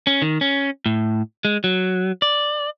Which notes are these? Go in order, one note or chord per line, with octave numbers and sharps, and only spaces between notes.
C#4
D#3
C#4
A2
G#3
F#3
D5